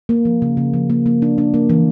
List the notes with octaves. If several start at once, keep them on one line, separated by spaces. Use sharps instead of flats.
A#3
F3
C#3
C#3
F3
A#3
A#3
D4
D4
A#3
E3